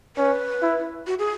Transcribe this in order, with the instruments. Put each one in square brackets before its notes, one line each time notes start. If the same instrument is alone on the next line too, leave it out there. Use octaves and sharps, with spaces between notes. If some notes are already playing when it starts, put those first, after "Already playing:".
[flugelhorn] C#4 [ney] B4
[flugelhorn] E4
[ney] F#4
G#4